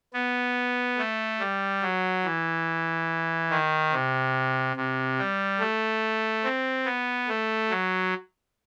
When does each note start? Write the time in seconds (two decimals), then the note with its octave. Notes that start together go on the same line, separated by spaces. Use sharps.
0.14 B3
0.98 A3
1.40 G3
1.82 F#3
2.25 E3
3.50 D#3
3.92 C3
4.76 C3
5.19 G3
5.59 A3
6.43 C4
6.85 B3
7.28 A3
7.70 F#3